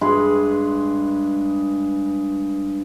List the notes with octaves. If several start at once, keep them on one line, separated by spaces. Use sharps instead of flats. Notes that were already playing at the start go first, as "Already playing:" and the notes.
G2 G#3 G#4 B4